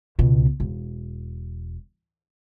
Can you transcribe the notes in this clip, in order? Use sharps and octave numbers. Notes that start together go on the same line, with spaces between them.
C#2 B2
E1